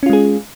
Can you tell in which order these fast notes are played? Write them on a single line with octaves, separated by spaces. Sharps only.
C#4 F4 G#3 G#4